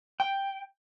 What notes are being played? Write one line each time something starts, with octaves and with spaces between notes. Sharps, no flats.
G5